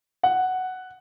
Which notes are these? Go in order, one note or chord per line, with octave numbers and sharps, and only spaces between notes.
F#5